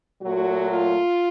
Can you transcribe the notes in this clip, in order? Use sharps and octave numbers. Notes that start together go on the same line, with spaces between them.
A#2 F#3 A3 F#4
F4